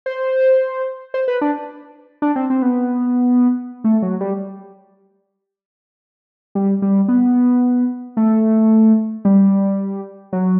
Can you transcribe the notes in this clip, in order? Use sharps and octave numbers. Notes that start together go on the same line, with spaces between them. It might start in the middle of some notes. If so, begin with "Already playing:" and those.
C5
C5
B4
D4
D4
C4
C4
B3
A3
F#3
G3
G3
G3
B3
A3
G3
F#3